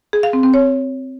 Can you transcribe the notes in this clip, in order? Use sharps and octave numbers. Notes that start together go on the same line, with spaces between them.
G#4
F5
C4
C4
C#5